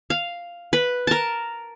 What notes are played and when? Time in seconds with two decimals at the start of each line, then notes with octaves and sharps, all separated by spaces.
0.10 F5
0.73 B4
1.07 A#4 A5